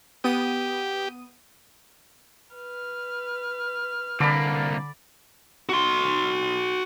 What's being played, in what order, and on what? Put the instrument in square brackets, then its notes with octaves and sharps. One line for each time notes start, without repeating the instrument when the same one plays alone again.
[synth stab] B3 D#6 D#7 [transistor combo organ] G4
[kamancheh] B4 F6
[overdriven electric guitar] C2 A#3 [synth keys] D3 [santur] D5 B5
[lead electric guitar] F#4 C6